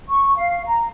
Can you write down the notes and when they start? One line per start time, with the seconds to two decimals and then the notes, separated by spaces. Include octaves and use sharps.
0.09 C#6
0.37 F5
0.66 A#5